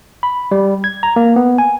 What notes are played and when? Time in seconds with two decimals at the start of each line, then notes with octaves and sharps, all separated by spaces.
0.23 B5
0.51 G3
0.84 G#6
1.03 A#5
1.16 A#3
1.36 B3
1.58 G#5